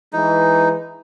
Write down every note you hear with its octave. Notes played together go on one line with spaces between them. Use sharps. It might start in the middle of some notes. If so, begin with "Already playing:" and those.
E3 G#3 D#4